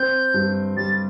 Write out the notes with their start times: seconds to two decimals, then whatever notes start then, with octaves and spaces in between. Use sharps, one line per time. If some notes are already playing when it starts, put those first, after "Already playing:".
Already playing: C4 G6
0.34 G2
0.77 G3 A6